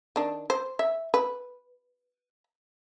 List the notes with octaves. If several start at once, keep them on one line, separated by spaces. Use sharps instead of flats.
D#3 D4
C5
E5
B4